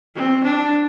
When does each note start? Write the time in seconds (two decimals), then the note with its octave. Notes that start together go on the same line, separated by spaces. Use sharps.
0.16 C4
0.44 D4